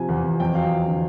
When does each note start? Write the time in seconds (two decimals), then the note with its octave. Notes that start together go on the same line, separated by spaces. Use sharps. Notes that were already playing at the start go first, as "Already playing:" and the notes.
Already playing: C3 F3 G#5
0.09 E2
0.24 E2
0.40 F2 G5
0.55 F#3 F5
0.71 F#3
0.87 D3